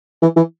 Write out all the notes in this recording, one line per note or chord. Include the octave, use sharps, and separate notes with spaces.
E3
E3